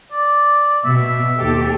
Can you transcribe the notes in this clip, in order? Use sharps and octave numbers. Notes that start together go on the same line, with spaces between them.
D5
B2 E5
D#2 G4 A4